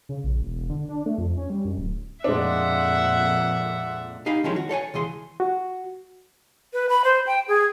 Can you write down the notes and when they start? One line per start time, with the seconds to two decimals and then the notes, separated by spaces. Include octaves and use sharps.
0.09 C#3
0.24 A#1
0.42 E1
0.69 D3
0.89 D4
1.06 A3
1.18 F2
1.37 C#4
1.50 G3
1.65 F#2
1.78 D1
2.24 F2 A#2 G#3 D4 E5 F#5
4.26 D#4 G4 F5 G#5 B5
4.44 D#3 F3 F#3 G#3 C#4 E4
4.56 F#4
4.69 A4 C#5 F#5 G#5
4.94 C#2 E3 G#4 C6
5.40 F#4
6.73 B4
6.89 B5
7.04 C5
7.27 G5
7.48 G#4